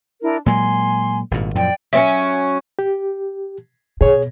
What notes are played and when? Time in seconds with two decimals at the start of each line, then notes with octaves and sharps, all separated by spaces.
0.22 D4 E4 A#4
0.46 A#2 F#3 G#3 G#5 C6
1.31 G#1 G2 A#2
1.55 F#2 A#2 F3 D5 G5
1.93 F#3 C4 C#4 E5
2.79 G4
4.01 B2 G#4 C#5